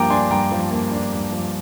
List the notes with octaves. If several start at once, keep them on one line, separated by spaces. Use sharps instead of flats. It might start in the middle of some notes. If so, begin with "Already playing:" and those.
Already playing: G2 F3 A#3 G5 A#5 D6
D4 G#5 C6
G2 G5 A#5
F3
A#3
D4
G2
F3